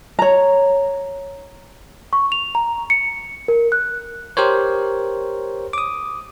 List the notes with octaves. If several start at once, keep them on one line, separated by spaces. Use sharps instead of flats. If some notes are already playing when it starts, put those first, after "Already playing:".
C#5 A#5
C#6
F7
A#5
C#7
A#4
F#6
G4 A#4 C5 C#5
D6 D#6